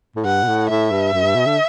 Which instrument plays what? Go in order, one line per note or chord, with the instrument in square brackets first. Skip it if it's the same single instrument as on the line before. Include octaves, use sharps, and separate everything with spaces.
[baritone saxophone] A2
[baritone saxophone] G2 [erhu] F#5
[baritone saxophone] B2
A2
[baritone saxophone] A2 [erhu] E5
[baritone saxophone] G2
F#2
G2
B2
D3